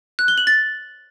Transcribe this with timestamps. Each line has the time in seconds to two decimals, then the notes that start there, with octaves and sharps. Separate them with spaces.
0.19 F#6
0.28 G7
0.38 F#7
0.47 A6